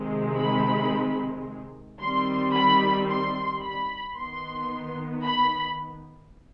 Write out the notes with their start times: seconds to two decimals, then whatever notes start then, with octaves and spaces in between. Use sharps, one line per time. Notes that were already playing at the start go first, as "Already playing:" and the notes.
Already playing: C3 D#3 G#3 C4
0.38 B5
2.00 D#3 G3 C4 C6
2.55 B5
3.09 C6
3.63 B5
4.17 D#3 B3 C6
5.25 B5